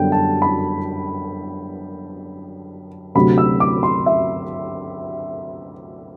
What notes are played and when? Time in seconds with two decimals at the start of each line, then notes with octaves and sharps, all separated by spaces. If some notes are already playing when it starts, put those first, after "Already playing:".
Already playing: F#2 D3 G3 B3 G5
0.12 A5
0.42 B5
3.15 D2 C3 F#3 B5
3.38 E6
3.60 D6
3.83 C6
4.06 E5